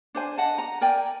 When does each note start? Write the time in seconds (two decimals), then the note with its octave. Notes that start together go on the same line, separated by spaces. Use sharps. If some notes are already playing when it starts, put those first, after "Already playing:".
0.15 D4 C5 G#5
0.38 D#5 F#5 A5
0.58 A#5
0.81 A#4 D5 G5 G#5